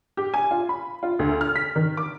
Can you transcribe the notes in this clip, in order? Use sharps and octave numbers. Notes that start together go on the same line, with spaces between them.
G4
G#5
F4
B5
F4
D2
F6
B6
D#3
D6